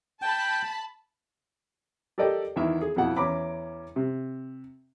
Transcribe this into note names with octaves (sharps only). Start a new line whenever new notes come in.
G5 A5 B5
G4 A4 A#4 D5 D#5 G5
E2 D#3 E4 E5
G#4
F2 B2 B3 E4 F#5
E2 C#4 A#5 B5 D6
C3